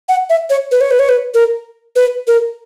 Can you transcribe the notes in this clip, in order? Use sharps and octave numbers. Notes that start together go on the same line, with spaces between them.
F#5
E5
C#5
B4
C#5
B4
C#5
B4
A#4
B4
A#4